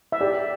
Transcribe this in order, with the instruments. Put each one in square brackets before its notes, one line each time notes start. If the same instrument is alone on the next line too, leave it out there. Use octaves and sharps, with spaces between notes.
[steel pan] E5
[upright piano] G4 [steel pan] D5